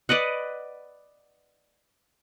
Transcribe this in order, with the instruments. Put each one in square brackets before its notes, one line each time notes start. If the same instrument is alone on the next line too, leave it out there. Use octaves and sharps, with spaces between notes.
[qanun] B4 D5 D#5 F#5